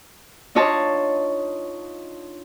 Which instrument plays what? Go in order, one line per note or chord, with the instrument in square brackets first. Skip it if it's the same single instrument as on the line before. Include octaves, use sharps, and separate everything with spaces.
[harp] D4 D#4 F4 C#5 D#5 A5